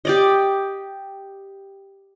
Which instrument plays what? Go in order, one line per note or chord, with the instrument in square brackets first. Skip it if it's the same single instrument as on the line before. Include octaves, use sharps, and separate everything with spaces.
[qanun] G4 D5 D#5